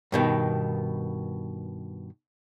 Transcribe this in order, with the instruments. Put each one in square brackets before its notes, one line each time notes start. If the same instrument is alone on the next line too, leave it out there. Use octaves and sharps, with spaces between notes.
[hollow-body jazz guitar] G2 B2 D#3